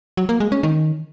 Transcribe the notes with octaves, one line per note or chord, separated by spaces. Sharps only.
F#3
A#3
G#3
C#4
D#3